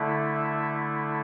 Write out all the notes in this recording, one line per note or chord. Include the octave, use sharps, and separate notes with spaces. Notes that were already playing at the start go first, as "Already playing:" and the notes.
Already playing: D3 A3 E4
E5